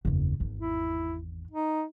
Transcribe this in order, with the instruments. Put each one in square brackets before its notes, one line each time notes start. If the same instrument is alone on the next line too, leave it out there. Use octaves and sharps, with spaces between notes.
[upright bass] F#1 E2
G#1 E2
[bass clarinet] E4
D#4